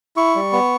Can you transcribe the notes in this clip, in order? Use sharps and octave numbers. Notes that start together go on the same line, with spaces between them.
E4 C#6
G3
B3